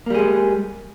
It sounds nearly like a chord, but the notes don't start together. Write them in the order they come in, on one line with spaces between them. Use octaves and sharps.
A#3 G3 G#4 G#3